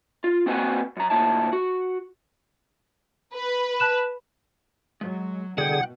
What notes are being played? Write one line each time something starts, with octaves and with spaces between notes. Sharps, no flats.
F4
A#3 C4 F#4 B4 F#5 G#5
F#2 A#5
D2 A#2 E4 A5
F#4
B4
A5 F#6 E7
F#3 G#3
C2 B2 D3 G#4 F#5 G5